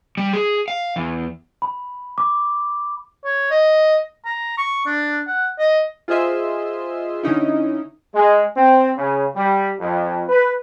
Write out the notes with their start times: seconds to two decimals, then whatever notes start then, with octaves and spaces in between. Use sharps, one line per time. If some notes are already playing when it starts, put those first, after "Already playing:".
0.17 G3
0.33 G#4
0.68 F5
0.96 E2
1.62 B5
2.18 D6
3.24 C#5
3.51 D#5
4.25 A#5
4.57 C#6
4.86 D4
5.27 F#5
5.59 D#5
6.08 F4 G#4 C5 D#5 E5 C6
7.23 D3 C#4 D#4 E4
8.14 G#3
8.56 C4
8.97 C#3
9.35 G3
9.80 F2
10.29 B4